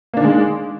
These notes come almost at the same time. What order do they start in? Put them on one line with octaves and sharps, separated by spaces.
A#3 D4 D#3 G#3